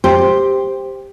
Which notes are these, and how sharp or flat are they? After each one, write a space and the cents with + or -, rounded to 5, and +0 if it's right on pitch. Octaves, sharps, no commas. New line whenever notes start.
G4 +10 C5 +0